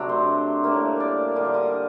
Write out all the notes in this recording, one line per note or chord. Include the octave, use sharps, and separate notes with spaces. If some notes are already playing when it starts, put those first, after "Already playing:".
Already playing: C3 F#3 A3 D4
C5
A2 G3 A#3
D5
D3 G3 A#3 D#5
D5
D#5